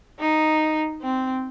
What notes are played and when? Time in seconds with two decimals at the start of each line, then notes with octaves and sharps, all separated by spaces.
0.20 D#4
1.02 C4